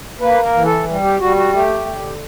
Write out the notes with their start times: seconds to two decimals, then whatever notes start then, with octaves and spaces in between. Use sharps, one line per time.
0.20 A#3 B4
0.43 A#4
0.54 E3
0.65 A4
0.87 G3
1.03 G4
1.20 G3 F#4
1.37 F#4
1.53 A3 G4
1.86 D3